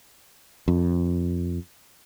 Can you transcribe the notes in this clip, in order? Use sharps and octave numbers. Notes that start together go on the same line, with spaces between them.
F2